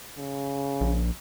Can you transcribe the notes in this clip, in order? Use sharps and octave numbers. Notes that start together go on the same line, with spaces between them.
C#3
A#1